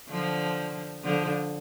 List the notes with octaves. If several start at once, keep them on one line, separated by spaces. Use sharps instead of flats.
D3 F3
D3 F3